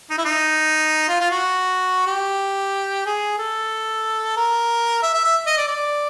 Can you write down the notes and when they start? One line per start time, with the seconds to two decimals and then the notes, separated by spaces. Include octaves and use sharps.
0.11 D#4
0.18 E4
0.25 D#4
1.09 F4
1.20 F4
1.31 F#4
2.07 G4
3.06 G#4
3.38 A4
4.37 A#4
5.03 E5
5.14 E5
5.24 E5
5.47 D#5
5.58 D5
5.68 D5